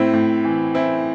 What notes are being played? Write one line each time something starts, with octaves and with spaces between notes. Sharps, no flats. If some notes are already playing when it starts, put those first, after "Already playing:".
Already playing: A2 C4 E4
A2
E3
E3 C4 E4